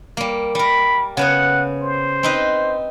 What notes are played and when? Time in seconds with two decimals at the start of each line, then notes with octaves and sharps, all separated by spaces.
0.17 G3 A#3
0.55 G3 A#4 B5
1.17 C#3 B3 C#5 F#5
1.82 C5
2.23 C4 D#4 B4